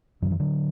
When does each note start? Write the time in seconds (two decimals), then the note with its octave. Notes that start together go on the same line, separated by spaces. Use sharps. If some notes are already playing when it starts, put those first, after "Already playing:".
0.22 F#2 D3 F#3
0.31 E3
0.40 D3 F#3